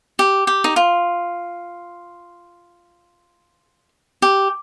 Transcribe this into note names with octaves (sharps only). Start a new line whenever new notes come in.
G4
G4
D#4
F4
G4